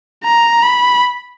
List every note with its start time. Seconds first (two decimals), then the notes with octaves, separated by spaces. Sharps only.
0.24 A#5
0.62 B5